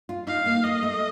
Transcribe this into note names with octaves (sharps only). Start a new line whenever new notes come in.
F4
D#4 F5
A#3
A#3 D#5
A3